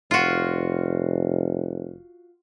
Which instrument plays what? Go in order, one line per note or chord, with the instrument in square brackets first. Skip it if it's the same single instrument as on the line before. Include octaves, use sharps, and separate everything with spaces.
[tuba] F1 [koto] F4 F#4